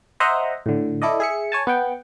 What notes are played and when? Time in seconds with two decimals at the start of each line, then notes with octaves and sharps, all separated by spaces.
0.20 C5 D#5 E5 F#5 A#5
0.66 A2 D3
1.02 E4 A4 D5 D#5
1.20 G#4 E5 C#7
1.52 C#5 G#5 A5
1.67 B3 F#5 G5